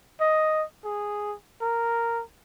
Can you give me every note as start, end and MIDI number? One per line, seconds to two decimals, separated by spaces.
0.20 0.64 75
0.85 1.34 68
1.61 2.22 70